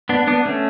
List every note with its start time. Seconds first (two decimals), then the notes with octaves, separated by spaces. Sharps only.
0.09 B3 D4
0.27 B3 D4
0.45 A3 C#4